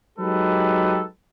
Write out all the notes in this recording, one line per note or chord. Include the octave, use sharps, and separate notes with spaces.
F#3 G#3 D#4 G4 A4 B4